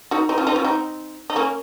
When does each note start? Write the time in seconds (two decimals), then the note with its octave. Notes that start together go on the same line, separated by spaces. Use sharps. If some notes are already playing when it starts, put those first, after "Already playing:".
0.11 D#4 F#4
0.29 C4 D#4
0.38 C#4 F4
0.47 C4 D#4
0.56 C#4 F4
0.64 C4 D#4
1.30 D#4
1.36 A#3 C#4